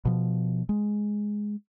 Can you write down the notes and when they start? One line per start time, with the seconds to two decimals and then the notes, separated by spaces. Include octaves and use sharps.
0.05 B2 F3
0.69 G#3